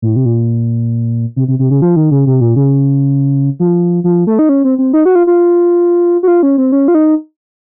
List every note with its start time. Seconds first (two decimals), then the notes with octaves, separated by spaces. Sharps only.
0.02 A2
0.16 C3
0.25 A#2
1.36 C3
1.48 C3
1.59 C3
1.71 C#3
1.82 F3
1.96 D#3
2.11 C#3
2.27 C3
2.41 A#2
2.56 C#3
3.60 F3
4.04 F3
4.27 A3
4.39 D#4
4.49 C#4
4.64 C4
4.79 C4
4.93 D#4
5.05 F#4
5.15 F4
5.27 F4
6.23 F#4
6.28 F4
6.43 C#4
6.58 C4
6.72 C#4
6.88 F4
6.95 D#4